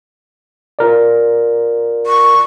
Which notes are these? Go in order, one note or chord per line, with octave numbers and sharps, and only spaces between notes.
F4 A#4 D5
C#6